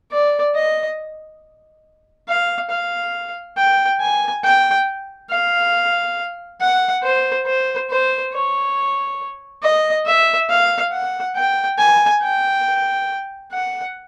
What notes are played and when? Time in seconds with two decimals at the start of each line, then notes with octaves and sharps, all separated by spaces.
0.11 D5
0.55 D#5
2.28 F5
2.70 F5
3.57 G5
4.00 G#5
4.44 G5
5.30 F5
6.61 F#5
7.03 C5
7.46 C5
7.90 C5
8.33 C#5
9.63 D#5
10.06 E5
10.49 F5
10.92 F#5
11.36 G5
11.78 G#5
12.23 G5
13.52 F#5